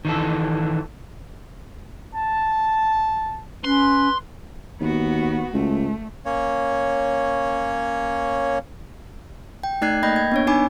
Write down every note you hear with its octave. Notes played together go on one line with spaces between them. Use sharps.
D#3 E3 A4
A5
C#4 B4 C6
D#2 B3 F#4
C#2 A3
A#3 C#4 C#5
G5
A3 D#4 D5 F#6 G#6 C7
A#3 D#5 G5 B5 G6 A#6
G#6
B3 D4 C#5
D4 D#4 C#5 G#5 B5 D6